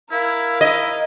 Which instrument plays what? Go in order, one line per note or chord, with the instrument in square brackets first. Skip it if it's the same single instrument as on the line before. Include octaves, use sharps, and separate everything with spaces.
[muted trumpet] E4 [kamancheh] A#4 F5
[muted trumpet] E4 [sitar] D#5